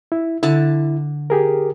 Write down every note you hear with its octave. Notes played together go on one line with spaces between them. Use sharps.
E4
D3 E4 A5
G4 G#4 A#4